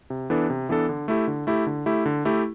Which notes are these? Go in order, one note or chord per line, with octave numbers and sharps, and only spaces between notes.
C3
E3 B3 D4 A4
C3
E3 B3 D4 A4
D3
A3 E4 G4
D3
A3 E4 G4
D3
A3 E4 G4
D3
A3 E4 G4